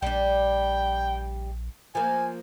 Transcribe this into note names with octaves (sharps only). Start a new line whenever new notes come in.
A#1 G3 D4 G5
F3 A#3 G#5